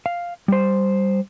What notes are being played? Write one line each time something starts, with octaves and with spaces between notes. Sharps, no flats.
F5
G3 C5